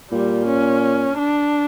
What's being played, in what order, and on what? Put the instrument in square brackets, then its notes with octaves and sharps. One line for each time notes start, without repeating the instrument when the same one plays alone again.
[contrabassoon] A#2 [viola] G3
[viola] C#4
D4